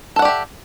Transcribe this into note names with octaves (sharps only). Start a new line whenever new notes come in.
G4 A4 D5 E5 F#5